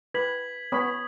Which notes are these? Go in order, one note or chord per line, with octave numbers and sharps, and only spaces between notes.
B4 G#6 B6 F#7
B3 C#5 B5 D#6